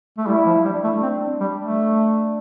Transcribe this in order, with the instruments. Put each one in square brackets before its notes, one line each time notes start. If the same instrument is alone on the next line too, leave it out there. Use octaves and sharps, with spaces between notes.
[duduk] A3
[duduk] G3 [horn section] E4
[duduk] F3
[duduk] G3 [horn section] D4
[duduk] A3
C4
G3
A3